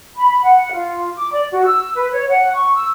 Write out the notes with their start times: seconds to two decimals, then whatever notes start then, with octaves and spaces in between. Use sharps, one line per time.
0.16 B5
0.43 F#5
0.72 F4
1.16 D6
1.32 D5
1.52 F#4
1.65 E6
1.95 B4
2.11 C#5
2.29 F#5
2.55 C#6
2.76 E6